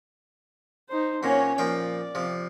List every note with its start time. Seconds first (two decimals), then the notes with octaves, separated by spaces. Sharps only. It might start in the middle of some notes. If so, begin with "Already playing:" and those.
0.89 D#4 C5
1.23 A#2 F#3 C#4 C#5
1.58 A#2 F3 D5 G5
2.15 C3 F3